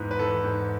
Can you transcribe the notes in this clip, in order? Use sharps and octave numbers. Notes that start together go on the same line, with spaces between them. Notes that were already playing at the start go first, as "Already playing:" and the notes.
Already playing: E2 G#2 E3 B4
B4
E3 A4
G#2